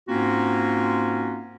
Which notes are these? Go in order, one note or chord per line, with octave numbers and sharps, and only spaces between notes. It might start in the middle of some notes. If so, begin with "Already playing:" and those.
G#2 A#3 C4 C#4 F4 F#4